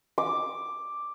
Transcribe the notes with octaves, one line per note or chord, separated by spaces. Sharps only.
D6